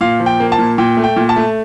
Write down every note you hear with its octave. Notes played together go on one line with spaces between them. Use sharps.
A#2 F5
F3
G5
A#3
A5
A#2
A#2 G5
A3
G5
A#2
A5
A3